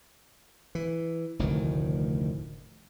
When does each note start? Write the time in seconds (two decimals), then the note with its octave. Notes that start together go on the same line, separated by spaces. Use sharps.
0.75 E3
1.39 F1 D2 A2 D#3